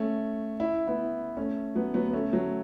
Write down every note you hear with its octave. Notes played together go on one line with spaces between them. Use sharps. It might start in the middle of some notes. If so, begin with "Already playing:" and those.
Already playing: A3 C#4
E4
B3 E4
A3 C#4
F#3 B3
F#3 B3
B3
A3 C#4
F#3